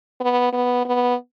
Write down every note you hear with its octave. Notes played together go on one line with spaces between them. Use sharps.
B3
B3
B3